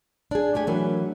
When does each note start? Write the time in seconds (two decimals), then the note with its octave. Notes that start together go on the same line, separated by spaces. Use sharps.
0.31 D4 G#4
0.55 A3 G4 G#5
0.67 E3 F#3 A3 D4 A#4